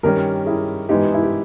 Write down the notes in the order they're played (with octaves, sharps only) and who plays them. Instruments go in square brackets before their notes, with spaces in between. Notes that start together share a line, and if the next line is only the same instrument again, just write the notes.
[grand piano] G2 D#3 G3 C#4 [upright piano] G4 A#4
[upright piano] E4 G#4
[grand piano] G#2 E3 G#3 B3 [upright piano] D#4 G4
[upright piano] E4
G4